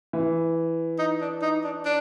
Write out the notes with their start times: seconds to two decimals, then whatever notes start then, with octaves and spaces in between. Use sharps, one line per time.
0.13 E3
0.99 D#4
1.21 D4
1.42 D#4
1.64 D4
1.85 D4